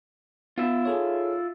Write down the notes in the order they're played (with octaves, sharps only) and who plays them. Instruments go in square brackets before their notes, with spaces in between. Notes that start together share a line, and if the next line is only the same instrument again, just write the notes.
[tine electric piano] B3 [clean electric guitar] F4 E5
[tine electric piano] G#4 A4 C#5